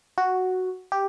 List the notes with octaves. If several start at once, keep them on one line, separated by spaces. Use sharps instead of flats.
F#4
G4